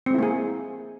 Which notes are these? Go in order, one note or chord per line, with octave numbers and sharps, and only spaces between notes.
G#3 A#3 C4 E4 G#4